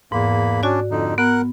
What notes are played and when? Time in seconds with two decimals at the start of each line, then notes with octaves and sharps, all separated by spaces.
0.12 E2 G#2 A#3 B5
0.63 C#4 D4 F#4 D5
0.91 F2 D3 D#4
1.18 B3 A#4 F#5 F#6